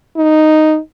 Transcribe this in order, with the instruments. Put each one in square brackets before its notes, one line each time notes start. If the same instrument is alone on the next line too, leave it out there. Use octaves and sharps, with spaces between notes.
[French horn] D#4